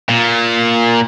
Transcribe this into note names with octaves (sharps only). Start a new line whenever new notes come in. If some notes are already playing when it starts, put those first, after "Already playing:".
A#2